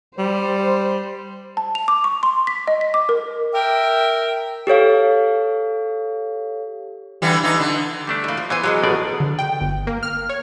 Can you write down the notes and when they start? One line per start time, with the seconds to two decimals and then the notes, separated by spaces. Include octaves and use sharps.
0.18 G3 C5
1.57 A5
1.75 F7
1.88 D6
2.04 C#6
2.23 C6
2.47 B6
2.68 D#5
2.81 B6
2.94 D6
3.09 A#4
3.53 A#4 E5 G5
4.67 G4 A4 C#5 F5
7.22 D3 E3 G3
7.43 E3 D#4
7.60 D3
8.07 G3 A3 D4
8.24 E3 A#3
8.37 F3
8.50 E3 B3 C5 G#5
8.63 F#3 G#3 B3
8.84 A1 B2 D5
9.20 D3
9.39 G5
9.61 G1
9.87 A#3
10.03 F6
10.29 C#5